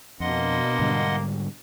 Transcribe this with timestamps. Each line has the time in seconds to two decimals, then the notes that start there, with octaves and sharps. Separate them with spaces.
0.20 F2 B2 A#3 D4 D#5 F#5 C6
0.79 G#2 D3 G3